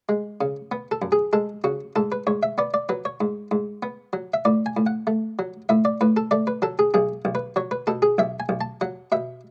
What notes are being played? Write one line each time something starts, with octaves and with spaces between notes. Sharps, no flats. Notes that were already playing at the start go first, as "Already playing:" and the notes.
G#3
C#3
B3
A4
F#2
G#4
G#3 A4
C#3 F#4
G#2 A4
B4
G#2 C#5
E5
B3 D5
D5
F#3 B4
C#5
G#2
G#2
B3
F#3
E5
A2 D5
G#5
A2
F#5
A3
F#3
A2 E5
D5
A2 B4
A4
A3 D5
B4
F#3 A4
G#4
B1 G#4
B1
B4
F#3 C#5
B4
B2 A4
G#4
B1 E5
G#5
B1
A5
F#3 F#5
B2 E5